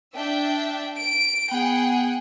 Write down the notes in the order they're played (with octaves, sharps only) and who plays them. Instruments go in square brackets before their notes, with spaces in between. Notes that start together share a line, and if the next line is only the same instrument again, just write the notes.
[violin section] D4 E5 G5
D7
[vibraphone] B3 [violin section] G#4 F#5 G5